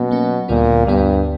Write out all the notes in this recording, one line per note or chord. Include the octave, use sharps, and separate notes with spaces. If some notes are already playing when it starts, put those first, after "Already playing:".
Already playing: B2 F#3 A#3 C#4
F#3 A#3 C#4
D2 A#2 D3 G3 B3
D2 G2 D3 G3 B3